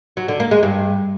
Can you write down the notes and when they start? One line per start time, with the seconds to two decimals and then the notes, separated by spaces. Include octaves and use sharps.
0.17 F#3
0.28 D3
0.40 A#3
0.51 G#3
0.63 G2